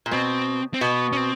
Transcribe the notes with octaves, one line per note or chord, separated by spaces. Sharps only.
A#2
B2 C4
C4
B2 B3
C#4
C4